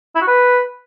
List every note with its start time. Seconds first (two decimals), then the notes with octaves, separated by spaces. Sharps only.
0.15 E4
0.21 F#4
0.28 B4